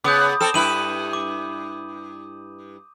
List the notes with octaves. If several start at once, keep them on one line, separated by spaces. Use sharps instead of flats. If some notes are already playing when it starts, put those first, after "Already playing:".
C#3 B3 D6 D#6 G6
C4 A4 E7
G2 E4 B4 D#7 F#7
D6